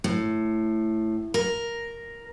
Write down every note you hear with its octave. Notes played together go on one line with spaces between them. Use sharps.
A2
A#4